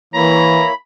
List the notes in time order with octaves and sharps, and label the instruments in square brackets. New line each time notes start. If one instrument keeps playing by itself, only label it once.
[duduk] E3 [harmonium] A#3 E4 C#5 [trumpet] A#5 [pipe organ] B5